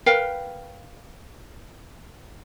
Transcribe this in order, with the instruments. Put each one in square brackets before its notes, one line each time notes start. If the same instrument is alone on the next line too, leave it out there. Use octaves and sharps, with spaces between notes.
[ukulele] A#4 B4 F5 G5